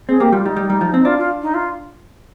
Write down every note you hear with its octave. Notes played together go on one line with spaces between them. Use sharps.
C4 G#4
A#3 G4
G3 F4
G3 D#4
G3
G3
F3
C4
D#4
D4 F4
F4
D#4
F4